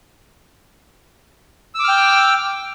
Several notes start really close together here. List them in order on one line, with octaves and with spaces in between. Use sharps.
E6 D6 F6 G5